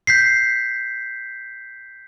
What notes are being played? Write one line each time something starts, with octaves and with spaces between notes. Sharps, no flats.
G6 B6 C7